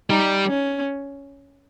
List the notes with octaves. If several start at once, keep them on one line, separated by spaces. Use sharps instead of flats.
G3 D#4
C#4